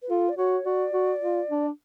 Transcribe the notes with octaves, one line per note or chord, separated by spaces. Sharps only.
B4
F4 A4
D5
F#4 C#5
F#4 D5
F#4
F4
D4